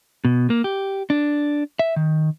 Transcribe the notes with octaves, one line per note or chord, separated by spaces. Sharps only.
B2
A#3
G4
D4
E5
D#3